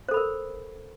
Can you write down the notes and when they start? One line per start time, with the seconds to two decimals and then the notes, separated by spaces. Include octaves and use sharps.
0.09 C5
0.11 A4
0.14 B5
0.17 A#4